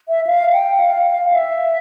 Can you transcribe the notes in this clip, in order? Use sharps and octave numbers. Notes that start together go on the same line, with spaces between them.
E5
F5
G5
F5
F5
E5